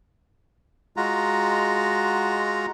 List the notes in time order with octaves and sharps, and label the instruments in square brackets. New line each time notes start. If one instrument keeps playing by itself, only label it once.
[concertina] G#3 F4 F#4 A#5